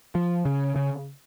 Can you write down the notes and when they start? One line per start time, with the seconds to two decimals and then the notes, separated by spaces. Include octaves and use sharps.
0.15 F3
0.45 C#3
0.76 C#3